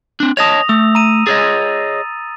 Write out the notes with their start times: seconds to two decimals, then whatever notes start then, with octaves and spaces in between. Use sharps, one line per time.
0.20 C4 D4
0.37 C#5 D#5 A5 D#6 A#6 F7
0.69 A3 E6
0.95 A#5 D#7
1.27 G#4 C#5 D#5 A6